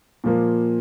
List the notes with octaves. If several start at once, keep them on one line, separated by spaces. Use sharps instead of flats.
A#2 F3 A#3